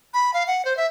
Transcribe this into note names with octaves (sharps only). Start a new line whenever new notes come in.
B5
F5
F#5
C5
E5